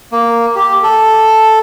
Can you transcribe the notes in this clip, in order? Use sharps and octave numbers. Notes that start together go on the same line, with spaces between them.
A#3
G4
A4